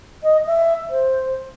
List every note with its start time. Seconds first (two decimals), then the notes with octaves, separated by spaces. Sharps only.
0.23 D#5
0.47 E5
0.90 C5